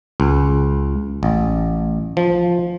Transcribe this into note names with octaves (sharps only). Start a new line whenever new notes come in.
C#2
A1
F3